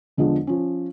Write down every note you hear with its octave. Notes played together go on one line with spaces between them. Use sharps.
E2 D3 F3 G#3 D4
F3 C#4